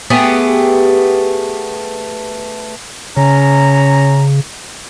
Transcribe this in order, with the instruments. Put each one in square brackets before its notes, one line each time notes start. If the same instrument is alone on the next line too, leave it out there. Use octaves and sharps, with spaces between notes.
[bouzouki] A3 B3 G4 G#4
[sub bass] C#3 [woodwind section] C#4 A#5